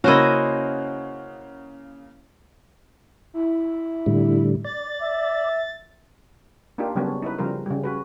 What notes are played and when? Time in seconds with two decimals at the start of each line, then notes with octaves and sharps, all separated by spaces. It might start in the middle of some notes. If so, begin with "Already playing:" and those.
0.04 C#3 A#3 C#4 E4 F#4 C5 D#5
3.34 E4
4.06 A2 D3 G3
4.65 D5 A6
5.02 E5
6.78 A#3 D4 D#4 F4 G4
6.95 C#3 F#3 G3 B3 C#4 D4
7.22 D#4 E4 B4
7.39 C#3 F3 G3 A#4 C5
7.66 C#3 G3
7.84 C#4 F#4 B4